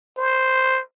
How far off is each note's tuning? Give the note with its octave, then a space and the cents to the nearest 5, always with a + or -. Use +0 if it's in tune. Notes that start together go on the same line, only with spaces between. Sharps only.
C5 +0